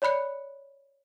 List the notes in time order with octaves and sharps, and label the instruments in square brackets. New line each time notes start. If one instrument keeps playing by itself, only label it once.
[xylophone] C#5 D5 B5 F#6 C#7